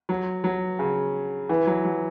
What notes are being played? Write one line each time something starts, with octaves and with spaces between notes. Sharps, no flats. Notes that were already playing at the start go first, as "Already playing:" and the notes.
F#3
F#3
C#3
E3
F#3
F#3